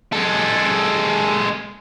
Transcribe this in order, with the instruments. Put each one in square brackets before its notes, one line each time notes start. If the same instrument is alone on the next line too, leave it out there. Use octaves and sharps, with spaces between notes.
[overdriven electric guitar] G#3 A4